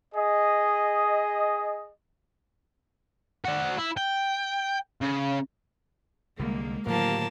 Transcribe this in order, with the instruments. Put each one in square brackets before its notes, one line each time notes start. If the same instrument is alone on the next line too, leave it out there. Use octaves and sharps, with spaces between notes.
[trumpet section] G#4 D#5
[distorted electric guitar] F#4 D5
E4
G5
C#3
[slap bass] C2 D3 G3 [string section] G#3 A#3
[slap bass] A2 D3 D#3 [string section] F3 F#3 G4 [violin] A#3 A5